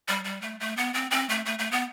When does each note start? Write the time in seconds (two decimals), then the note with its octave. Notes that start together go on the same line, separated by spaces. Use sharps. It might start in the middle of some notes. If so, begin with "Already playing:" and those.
0.08 G3
0.24 G3
0.42 A3
0.60 A3
0.77 B3
0.94 C4
1.11 C4
1.29 A3
1.46 A3
1.59 A3
1.71 B3